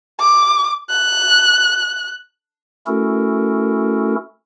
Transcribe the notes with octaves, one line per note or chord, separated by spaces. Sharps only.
D6
F#6
A3 C#4 E4 F#4 A4 A#4